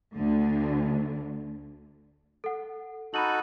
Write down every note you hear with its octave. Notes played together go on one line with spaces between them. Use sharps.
D2 D3
A4 F#5
D#4 F#4 A4 B5 D#7 F#7